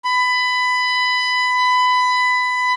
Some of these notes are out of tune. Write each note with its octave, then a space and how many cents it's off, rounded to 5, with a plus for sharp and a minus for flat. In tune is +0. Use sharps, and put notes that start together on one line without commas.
B5 +20